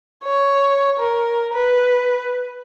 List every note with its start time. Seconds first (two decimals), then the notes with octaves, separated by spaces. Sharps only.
0.24 C#5
0.99 A#4
1.53 B4